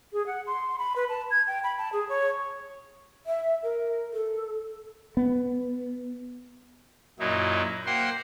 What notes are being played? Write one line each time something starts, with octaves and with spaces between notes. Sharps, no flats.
G#4
F#5
C6
B5
B4
A5
G#6
G5
B5
A5
G#4
C#5
E5
A#4
A4
B3
F#2 A#2 F#3 D#4 E4
A#3 C5 F#5 G5 C6